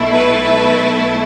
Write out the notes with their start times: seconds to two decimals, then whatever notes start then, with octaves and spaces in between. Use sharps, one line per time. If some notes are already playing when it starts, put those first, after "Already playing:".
Already playing: B1 B2 A3 E4
0.13 B4